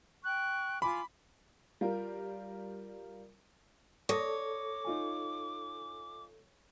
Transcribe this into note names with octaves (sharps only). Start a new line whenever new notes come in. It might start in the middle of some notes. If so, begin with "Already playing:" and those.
G5 C#6 F#6
F4 G#5 B5 D6
G3 F4 A#4
A4 C#5 D6 D#6 A#6
D#4 F4 G#5